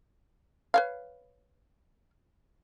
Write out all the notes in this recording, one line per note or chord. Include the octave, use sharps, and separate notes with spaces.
B4 C#5 F5